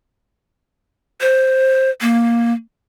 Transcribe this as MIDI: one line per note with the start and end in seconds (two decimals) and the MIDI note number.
1.21 1.90 72
2.01 2.53 58